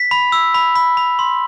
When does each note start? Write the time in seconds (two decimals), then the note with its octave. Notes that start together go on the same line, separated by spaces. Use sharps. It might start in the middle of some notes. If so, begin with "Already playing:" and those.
Already playing: B6
0.11 B5
0.32 E6
0.54 B5
0.75 B5
0.97 B5
1.19 C6